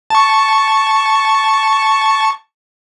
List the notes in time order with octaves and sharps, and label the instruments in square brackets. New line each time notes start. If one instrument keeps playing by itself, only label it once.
[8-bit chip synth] A5 C#6